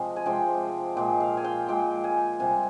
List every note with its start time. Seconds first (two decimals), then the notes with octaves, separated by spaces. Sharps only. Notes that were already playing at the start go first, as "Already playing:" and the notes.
Already playing: C3 F3 G#3 D#5
0.16 G#5
0.26 C3 F3 G#3 G5
0.97 A#2 G#3 G5
1.20 F5
1.37 G#5
1.44 G5
1.68 A#2 G#3 G5
2.04 G#5
2.40 C3 G3 G#5